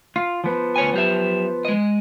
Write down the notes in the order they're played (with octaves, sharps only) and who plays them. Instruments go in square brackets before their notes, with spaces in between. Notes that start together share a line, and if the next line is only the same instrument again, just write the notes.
[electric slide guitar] F4
F3 B3
[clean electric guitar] D2 C#5 G#5
F#3 G4 E5
G#3 D#5